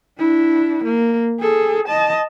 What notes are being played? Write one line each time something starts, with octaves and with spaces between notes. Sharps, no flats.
D4 E4
A#3
G#4 A4
D#5 A5